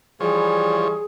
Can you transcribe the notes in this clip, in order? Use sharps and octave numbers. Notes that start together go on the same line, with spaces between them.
E3 F3 G3 G#4 C#5